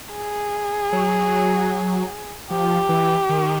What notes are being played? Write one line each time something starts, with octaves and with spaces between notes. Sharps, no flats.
G#4
F#3
F3 G4
E3
D#3